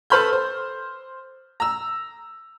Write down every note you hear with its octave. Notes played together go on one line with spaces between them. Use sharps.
A4 B4 C5 B5 F6 G6
C5
A#5 E6